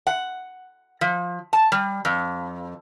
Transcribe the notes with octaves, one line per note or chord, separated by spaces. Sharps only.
F#5
F3
A5
G3
F2